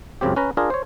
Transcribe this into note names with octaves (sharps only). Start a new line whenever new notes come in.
C#2 F#2 C#3 C4 G4
C#4 B4 A#5
D4 F4 G#4 A#4
C5 C#5